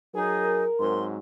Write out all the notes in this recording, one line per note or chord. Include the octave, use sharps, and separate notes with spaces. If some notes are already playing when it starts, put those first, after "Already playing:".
F#3 D#4 G#4 A#4
G#2 F#3 C4 C6